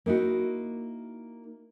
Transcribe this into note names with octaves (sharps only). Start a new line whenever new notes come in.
A#3 D#4 E4 F#4